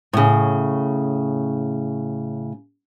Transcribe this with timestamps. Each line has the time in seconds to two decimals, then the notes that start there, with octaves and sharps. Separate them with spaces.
0.13 A2 C#3